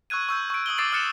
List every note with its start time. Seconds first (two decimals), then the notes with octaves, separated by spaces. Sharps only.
0.10 C#6 E6 F#6 G#6 D#7
0.29 C#6 E6 G6
0.50 C#6 D7
0.66 D#6 E6 F#7 G7
0.78 C#6 D6 E6 A6 C7 D7
0.92 D#6 F6 F#6 A6 C#7 E7